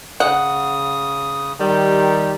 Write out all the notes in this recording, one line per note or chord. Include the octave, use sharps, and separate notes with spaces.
C#3 F#5 D#6
D#3 G3 G4